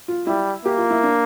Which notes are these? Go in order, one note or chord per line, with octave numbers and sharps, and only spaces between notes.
F4
G3 E4
A#3 G4
F4
E4
D4